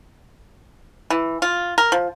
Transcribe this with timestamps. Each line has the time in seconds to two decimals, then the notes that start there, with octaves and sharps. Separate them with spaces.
1.10 E3
1.42 F4
1.78 A#4
1.92 F3